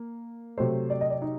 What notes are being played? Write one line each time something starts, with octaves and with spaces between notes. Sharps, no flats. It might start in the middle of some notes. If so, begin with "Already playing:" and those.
Already playing: A#3
C3 F#3 A3 C5
D5
D#5
D5
D#4